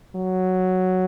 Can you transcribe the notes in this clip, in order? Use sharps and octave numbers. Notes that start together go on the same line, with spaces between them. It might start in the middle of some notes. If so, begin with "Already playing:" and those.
F#3